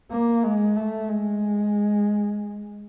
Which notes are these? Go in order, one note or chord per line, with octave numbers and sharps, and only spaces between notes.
A#3
G#3
A3
G#3